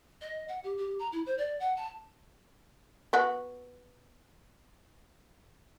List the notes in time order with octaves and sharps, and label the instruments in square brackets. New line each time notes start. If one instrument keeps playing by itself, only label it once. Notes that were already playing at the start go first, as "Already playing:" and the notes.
[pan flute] D#5
F#5
G4
G4
A#5
E4
C5
D5
F#5
A5
[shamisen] B3 F#4